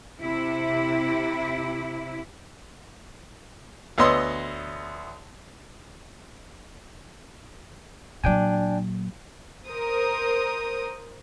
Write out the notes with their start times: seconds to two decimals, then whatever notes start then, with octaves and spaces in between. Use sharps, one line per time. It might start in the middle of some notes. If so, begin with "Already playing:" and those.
0.19 C3 E4
3.98 D2 B3 C#5 D#5 C6 E6
8.24 A#2 F#3 D4 G5 G#5
9.68 A#4 C5 D#6